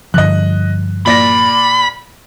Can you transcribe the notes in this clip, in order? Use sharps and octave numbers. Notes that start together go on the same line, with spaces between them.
G2 D3 F3 D#5 F#6
A#2 D5 B5 A#6